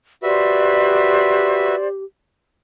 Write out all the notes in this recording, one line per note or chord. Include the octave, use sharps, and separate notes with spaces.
F#4 G4 B4 C5 D5 E5